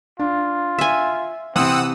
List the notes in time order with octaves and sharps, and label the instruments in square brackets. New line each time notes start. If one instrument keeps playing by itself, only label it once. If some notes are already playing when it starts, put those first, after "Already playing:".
[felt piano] D4 [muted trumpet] F4
[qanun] E5 G#5
[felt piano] C3 E3 [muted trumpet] C4 [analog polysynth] F#5 D#6 E6